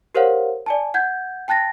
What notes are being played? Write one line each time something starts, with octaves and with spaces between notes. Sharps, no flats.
G4 A#4 C5 C#5 F5 F#5
D5 G#5 A5
F#5 G6 G#6
G5 A5 F#6 A6 A#6